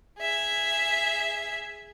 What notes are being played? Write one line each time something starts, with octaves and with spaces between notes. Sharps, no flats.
G#4 E5